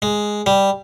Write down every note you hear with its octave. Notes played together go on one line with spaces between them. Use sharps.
G#3
G3